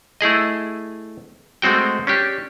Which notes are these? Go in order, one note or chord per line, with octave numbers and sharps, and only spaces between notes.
A3 E4 G#4 D#5
G#3 A3 C4 F#4 G5
C#4 D4 G4